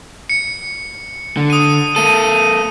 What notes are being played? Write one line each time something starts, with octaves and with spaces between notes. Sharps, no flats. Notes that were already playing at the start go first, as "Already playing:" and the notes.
C#7
D3
D#6 D#7
A#3 A4 D#7